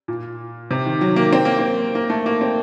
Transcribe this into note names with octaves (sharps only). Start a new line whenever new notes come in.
A#2
C3
D#3
F#3
A#3
C4
A#3
C4
A#3
A3
A#3
C4